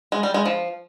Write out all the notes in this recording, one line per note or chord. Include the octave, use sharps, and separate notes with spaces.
G#3
G3
G#3
F3